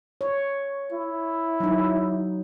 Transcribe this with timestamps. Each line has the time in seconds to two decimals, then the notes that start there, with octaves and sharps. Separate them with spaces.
0.21 C#5
0.92 E4
1.60 F#3 D#4